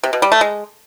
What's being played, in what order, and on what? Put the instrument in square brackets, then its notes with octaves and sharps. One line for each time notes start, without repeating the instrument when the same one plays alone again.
[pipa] C3
B2
G3
A3
G#3